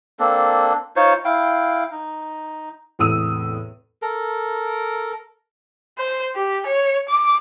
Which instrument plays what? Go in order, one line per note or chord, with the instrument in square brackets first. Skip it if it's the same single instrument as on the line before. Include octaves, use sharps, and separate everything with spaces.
[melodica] A#3 C4 D4 A4
D#4 F4 C5 C#5
E4 F5 G5
D#4
[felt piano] E2 A2 C3 D#6 E6 D#7
[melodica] A4 A#4
[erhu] C5
G4
C#5
D6